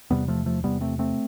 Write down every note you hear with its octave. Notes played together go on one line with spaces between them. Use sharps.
E2 C3 G3 B3
F3 A3
F3 A3
E2 C3 G3 B3
A3 C4
A3 C4